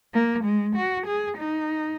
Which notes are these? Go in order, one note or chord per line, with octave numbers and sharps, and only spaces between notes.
A#3
G#3
F#4
G#4
D#4